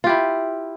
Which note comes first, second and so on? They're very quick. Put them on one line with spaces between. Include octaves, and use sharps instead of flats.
F4 G4 E4